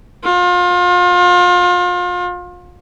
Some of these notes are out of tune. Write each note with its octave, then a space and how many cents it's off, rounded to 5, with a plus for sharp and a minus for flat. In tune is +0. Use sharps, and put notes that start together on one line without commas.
F4 +35